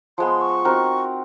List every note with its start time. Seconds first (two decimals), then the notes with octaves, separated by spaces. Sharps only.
0.18 F3 G#3 B3 C6
0.41 C#6
0.65 C4 D#4 F#4 A#4